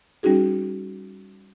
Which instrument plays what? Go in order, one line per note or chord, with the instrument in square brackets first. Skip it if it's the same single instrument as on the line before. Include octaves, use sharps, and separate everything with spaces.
[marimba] G3 C#4 D#4 F#4 G#4